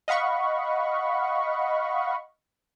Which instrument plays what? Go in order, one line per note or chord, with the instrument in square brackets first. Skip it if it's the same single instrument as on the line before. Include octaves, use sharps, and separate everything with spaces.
[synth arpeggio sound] D#5 F5 F#5 B5 C#6